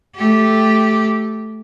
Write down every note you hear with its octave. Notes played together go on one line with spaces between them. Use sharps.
A3 G4